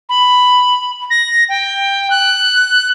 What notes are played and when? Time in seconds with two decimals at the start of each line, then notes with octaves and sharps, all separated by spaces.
0.09 B5
1.10 A#6
1.49 G5
2.11 F#6